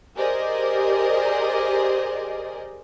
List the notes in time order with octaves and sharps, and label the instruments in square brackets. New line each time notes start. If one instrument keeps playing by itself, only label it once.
[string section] G4 G#4 A#4 C5 D5 D#5